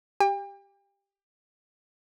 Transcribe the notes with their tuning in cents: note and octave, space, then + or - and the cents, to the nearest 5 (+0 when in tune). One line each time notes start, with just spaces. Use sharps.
G4 +0 G5 +40